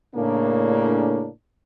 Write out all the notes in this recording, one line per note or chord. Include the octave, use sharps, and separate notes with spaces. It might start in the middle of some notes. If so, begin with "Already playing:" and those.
A2 C#3 A#3 D4